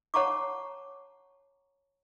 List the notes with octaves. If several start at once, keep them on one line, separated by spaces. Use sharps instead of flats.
C#5 F#5 A5 A#5 C#6 D6